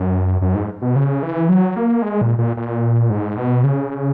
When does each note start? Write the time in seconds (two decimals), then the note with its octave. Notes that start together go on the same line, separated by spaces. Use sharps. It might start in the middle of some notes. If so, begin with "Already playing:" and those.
Already playing: F#2
0.42 F#2
0.55 G#2
0.82 B2
0.96 C#3
1.23 E3
1.49 F#3
1.76 A#3
2.02 G#3
2.21 A#2
2.38 A#2
2.57 A#2
3.10 G#2
3.37 B2
3.64 C#3